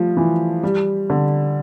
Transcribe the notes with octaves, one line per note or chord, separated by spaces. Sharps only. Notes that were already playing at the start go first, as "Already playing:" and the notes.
Already playing: F3 G3 A3
E3
G3
D3